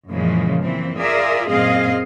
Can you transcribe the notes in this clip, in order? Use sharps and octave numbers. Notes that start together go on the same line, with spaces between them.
F#2 A#2 C#3 E3 F3 G#3
A#2 E3 C4
F4 G#4 A#4 D5 E5
F#2 A#2 C4 G#4 D#5 F5